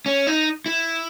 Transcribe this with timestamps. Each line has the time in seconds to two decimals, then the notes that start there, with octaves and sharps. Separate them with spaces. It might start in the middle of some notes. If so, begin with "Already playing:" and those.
0.06 C#4
0.27 D#4
0.66 E4